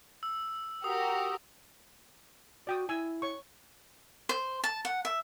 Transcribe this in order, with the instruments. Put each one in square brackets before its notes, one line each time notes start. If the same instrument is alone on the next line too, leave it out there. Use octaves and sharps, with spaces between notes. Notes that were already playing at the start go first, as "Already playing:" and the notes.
[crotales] E6
[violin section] F#4 G4 A#4 [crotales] D#6
[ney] F#4 [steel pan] D5 G5 D#6
[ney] E4 [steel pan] G#5 E6
[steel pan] C#5 C#6
[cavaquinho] C5
A5
F#5
E5